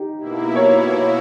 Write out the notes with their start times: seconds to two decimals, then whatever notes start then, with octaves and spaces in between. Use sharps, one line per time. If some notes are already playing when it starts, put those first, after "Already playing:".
Already playing: D#4 G4
0.20 B2 A#3 E4
0.56 C#5
0.92 C#5